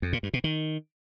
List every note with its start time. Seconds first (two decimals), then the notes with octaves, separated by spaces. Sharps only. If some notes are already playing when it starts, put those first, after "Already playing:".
0.02 F2
0.13 A#2
0.23 G2
0.34 B2
0.44 D#3